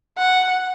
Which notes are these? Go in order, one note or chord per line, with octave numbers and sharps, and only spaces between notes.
F#5